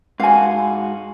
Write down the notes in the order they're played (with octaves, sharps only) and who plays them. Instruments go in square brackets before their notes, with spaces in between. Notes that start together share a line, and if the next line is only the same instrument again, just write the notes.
[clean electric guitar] G#2 F#4 [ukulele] F5 G#5